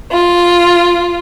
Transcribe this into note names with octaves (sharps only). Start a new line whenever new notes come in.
F4